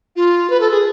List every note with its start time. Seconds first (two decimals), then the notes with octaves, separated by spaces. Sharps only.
0.16 F4
0.50 B4
0.60 A4
0.71 G#4